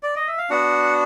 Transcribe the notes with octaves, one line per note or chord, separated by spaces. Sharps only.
D5
D#5
E5
F5
B3 D4 F#4 F#5